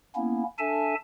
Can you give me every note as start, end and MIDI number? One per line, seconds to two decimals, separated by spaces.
0.16 0.43 58
0.16 0.43 59
0.16 0.43 61
0.16 0.43 64
0.59 0.94 62
0.59 0.94 69
0.59 0.94 76
0.59 0.94 80
0.59 0.94 81